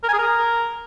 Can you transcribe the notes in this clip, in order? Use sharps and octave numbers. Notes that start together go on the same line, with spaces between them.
A#4
G#5
G#4
A#4